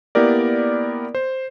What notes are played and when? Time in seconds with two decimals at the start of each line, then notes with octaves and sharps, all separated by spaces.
0.15 A#3 B3 E4 G4 A#4 D5
1.15 C5